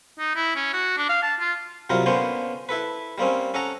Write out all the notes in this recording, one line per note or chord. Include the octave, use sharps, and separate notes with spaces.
D#4
E4
C#4
F#4
D4
F5
A5
F4
C3 F#3 G3 F4 A#4
D3 A#3 B3 C#4 C5 C6
E4 A4 B4
G3 A#3 C4 C#4
C#4 A4 F#5 A#5